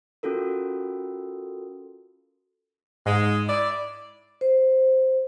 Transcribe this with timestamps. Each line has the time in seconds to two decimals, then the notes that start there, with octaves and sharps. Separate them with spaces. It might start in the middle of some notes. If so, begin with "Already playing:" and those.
0.23 C#4 F4 F#4 A4 A#4
3.06 G#2 G#3
3.48 E4 D5
4.41 C5